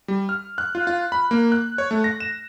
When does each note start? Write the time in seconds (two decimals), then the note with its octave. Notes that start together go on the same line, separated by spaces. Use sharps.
0.08 G3
0.29 F6
0.58 F#6
0.75 F4
0.87 F4
1.12 B5
1.31 A#3
1.52 F#6
1.78 C#5
1.91 A3
2.04 A#6
2.20 E7